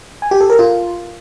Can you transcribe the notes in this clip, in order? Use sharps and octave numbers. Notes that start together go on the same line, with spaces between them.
G#5
G4
A4
A#4
F4